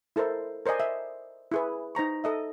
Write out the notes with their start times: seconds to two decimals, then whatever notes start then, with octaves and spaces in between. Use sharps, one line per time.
0.16 E4 A4 A#4 C5 D#5
0.66 A#4 C5 D5 D#5 G#5
0.80 E5
1.52 E4 G#4 B4
1.95 D#4 C5 A#5 C#6
2.24 A4 D#5 E5